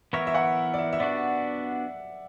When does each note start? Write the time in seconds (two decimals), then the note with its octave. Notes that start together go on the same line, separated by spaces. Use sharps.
0.13 E3 B3 E4 A#4 C#5 E5
0.27 E5
0.34 F#5
0.74 D5
0.79 E5
0.93 E5
1.00 B3 D4 F#4 D5